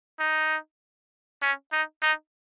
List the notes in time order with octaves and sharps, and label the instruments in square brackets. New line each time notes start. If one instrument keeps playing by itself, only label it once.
[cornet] D#4
C#4
D#4
D#4